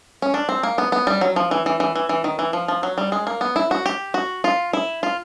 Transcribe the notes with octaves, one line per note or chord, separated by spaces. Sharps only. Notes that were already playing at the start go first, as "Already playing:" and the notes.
C#4
D4
C4
A#3
B3
B3
G3
F#3
F3
E3
E3
E3
E3
E3
D#3
E3
F3
F3
F#3
G3
G#3
A#3
B3
E4
F#4
G4
F#4
F4
E4
F4